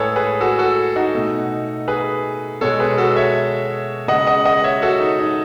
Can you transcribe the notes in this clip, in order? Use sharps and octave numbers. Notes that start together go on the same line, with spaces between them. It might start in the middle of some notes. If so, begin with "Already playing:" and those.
Already playing: A2 G#3 G#4 A4 B4 C#5
G#4 B4
F#4 A4
F#4 A4
D#4 F#4
B2 A3
G#4 B4
B2 G#3 A4 C#5
G#4 B4
F#4 A4
C#5 E5
C#3 G#3 D#5 F#5
D#5 F#5
D#5 F#5
C#5 E5
F#4 A4
D#4
D#4